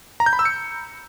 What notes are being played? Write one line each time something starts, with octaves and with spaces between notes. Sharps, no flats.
A#5
G6
B5
E6
C#7